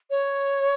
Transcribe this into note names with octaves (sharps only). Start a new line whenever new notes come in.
C#5